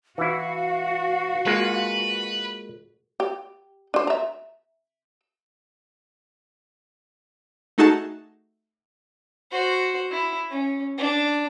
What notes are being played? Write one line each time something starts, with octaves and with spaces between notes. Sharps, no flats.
E3 E4 F#4 F5
G#3 A#3 F4 B4
G4
D4 C5
E5 A#5
A3 D#4 F#4 G#4 A5
F#4 C5
E4
C#4
D4